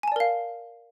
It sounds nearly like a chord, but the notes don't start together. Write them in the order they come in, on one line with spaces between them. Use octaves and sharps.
G#5 A5 D5 A#4 F5